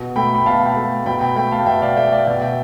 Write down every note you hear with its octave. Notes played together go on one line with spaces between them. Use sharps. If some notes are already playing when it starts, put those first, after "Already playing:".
Already playing: B2
A3 G5 B5
B5
B2 F5 A5
G5 B5
A3
B2 G5 B5
G5 B5
A3 G5 B5
F5 A5
B2 E5 G5
D5 F5
A3 E5 G5
D5 F5
B2 E5 G5
E5 G5